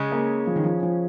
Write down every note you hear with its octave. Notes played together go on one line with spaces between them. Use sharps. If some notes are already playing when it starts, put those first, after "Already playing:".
Already playing: C#3 G#3 C#4
A#3
F3
D#3
F3
F3